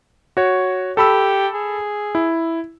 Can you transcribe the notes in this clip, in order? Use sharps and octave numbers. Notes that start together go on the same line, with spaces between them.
F#4 C#5
G4 A4 B5 E6
G#4
E4